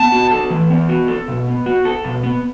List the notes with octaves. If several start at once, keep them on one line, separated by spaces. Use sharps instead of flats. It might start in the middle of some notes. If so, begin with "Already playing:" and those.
Already playing: B3 A5
F#4
A4
E3
B3
F#4
A4
B2
B3
F#4
A4
B2
B3